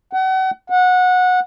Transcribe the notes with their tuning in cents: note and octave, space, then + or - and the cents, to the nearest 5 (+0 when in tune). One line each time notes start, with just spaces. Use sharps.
F#5 +35
F#5 -20